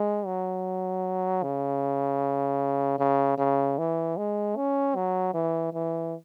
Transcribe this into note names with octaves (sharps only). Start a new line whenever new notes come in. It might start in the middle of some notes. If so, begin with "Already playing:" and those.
Already playing: G#3
F#3
C#3
C#3
C#3
E3
G#3
C#4
F#3
E3
E3